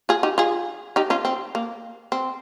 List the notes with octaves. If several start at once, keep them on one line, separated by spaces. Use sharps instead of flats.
F4 G#4
D#4 G4
F4 G#4
D#4 G4
C#4 F4
C4
A#3
C4